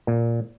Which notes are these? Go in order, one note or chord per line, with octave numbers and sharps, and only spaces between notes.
A#2